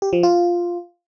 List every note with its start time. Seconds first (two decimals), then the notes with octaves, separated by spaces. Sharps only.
0.02 G4
0.13 F3
0.23 F4